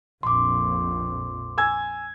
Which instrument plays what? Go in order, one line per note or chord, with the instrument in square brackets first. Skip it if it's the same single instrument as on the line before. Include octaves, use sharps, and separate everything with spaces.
[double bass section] A#1 F2 [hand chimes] C6 D6
[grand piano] G#5 E6 G#6